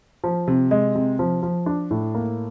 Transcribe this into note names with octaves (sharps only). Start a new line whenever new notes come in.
F3
C3
G#3
C3
F3
F3
D4
A2
A#3